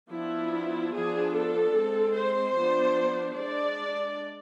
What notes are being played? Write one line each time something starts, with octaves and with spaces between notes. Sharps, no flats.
F3 B3 D4 E4
F3 B3 D4 G#4
A4
G#3 C4
C5
F3 B3 D4
G#3 D4 D5